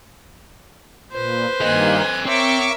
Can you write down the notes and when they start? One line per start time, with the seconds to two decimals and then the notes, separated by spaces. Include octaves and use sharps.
1.13 A#2 B4 C5
1.61 G2 D#3 A#3 A4 D#5 G#5 F#6
2.25 C4 A#4 C#5 E5 C#6 D6